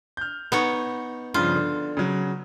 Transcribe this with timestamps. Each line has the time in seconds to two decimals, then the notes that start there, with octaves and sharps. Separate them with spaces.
0.17 F6 G6
0.52 B3 D#4 C#5
1.34 G2 C#3 F3 F4
1.55 D3
1.97 C#3 F#3